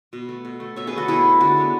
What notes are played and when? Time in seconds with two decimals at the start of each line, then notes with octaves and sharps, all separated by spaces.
0.13 B2
0.29 A3
0.45 B2
0.60 A3
0.76 B2 C#5 E5
0.87 G#4 B4
0.93 A3 F#4 A4
1.08 B2 E4 G#4
1.25 A3
1.40 D3 D4 F#4
1.57 G#3 B3